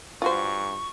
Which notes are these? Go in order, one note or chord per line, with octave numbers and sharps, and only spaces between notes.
G2 F4 F#4 C5 C#6